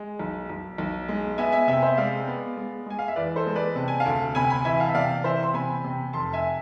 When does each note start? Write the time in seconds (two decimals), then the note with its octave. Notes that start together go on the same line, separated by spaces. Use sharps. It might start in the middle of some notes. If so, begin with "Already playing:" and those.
Already playing: G#3
0.19 B1
0.49 B1
0.78 B1
1.09 G#3
1.38 B3 E5 G#5
1.52 E5 G#5
1.68 C3 E5 G#5
1.82 C5 E5
1.97 G#3 D5 F5
2.27 B3
2.57 G#3
2.86 G#3 G#5
2.99 F5
3.08 E5
3.16 E2 B4 D5
3.36 A4 C5
3.46 G#3
3.56 B4 D5
3.75 C3 A5
3.88 G#5
4.00 F5 A5
4.06 D2
4.35 C3 G#5 B5
4.50 G#5 B5
4.65 E3 E5 G#5
4.80 F5 A5
4.89 E5
4.95 C3 D5 F5
5.24 E3 C5 E5
5.43 C6
5.54 C3 G#5 B5
5.84 C3
6.13 F1 A5 C6
6.33 E5 G#5